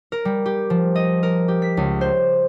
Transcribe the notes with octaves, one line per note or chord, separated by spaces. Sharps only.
A#4
G3
G4
F3
D#5
A#4
G4
B6
C#2
C5